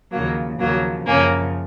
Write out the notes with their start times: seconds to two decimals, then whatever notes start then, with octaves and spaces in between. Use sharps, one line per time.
0.11 D#2 C#3 F3 F#3 A#3
0.59 D#2 C#3 F3 F#3 A#3
1.06 F#2 C#3 F3 A#3 C#4